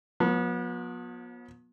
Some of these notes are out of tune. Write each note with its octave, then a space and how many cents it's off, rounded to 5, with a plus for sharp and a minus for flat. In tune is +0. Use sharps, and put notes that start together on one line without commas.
F3 +45 B3 -30